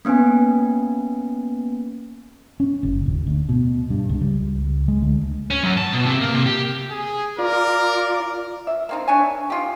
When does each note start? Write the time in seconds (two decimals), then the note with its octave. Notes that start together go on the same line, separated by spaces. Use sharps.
0.05 A#3 B3 C#4 B4 G#5
2.60 C#4
2.83 F#1
3.06 D#1
3.26 D2
3.49 B2
3.90 G2
4.09 C#2
4.21 G3
4.40 C#2
4.88 G#3
5.02 D2
5.50 C#4
5.63 F#2
5.77 A5
5.93 B2
6.06 C3
6.21 A#3
6.34 C3
6.46 G4
6.90 G#4
7.39 F4 A#4 D5
8.67 E5
8.89 A#3 C4 D#4
9.08 D4 C#5 E5 G#5
9.50 D#4 F4 G4